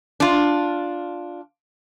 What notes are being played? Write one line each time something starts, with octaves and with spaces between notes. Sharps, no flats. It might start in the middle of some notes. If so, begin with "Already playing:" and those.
D4 F4